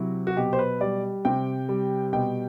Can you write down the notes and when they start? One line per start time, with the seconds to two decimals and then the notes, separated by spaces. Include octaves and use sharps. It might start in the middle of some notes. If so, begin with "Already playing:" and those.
Already playing: C3 F#3 E4
0.27 F#4
0.36 B2 G4
0.53 C5
0.59 B4
0.81 G3 D5
1.25 C3 G5
1.69 G3
2.13 B2 G5